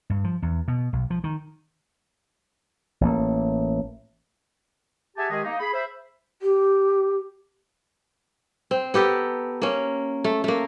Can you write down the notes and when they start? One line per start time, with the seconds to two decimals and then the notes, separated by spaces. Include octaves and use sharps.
0.10 G2
0.24 F3
0.42 E2
0.68 B2
0.93 B1
1.10 F3
1.24 D#3
3.01 A1 A#3
5.17 G4 G#4 E5 F#5 G#5 A5
5.30 D#3 G#3 G4 G#4 D#5
5.44 A#3 D#4
5.60 G#4 B5
5.74 C5 E5 B5
6.42 G4
8.71 C4
8.94 B3 G4 A4 A#4
9.62 A#3 C#4
10.24 A3
10.44 A3 A#3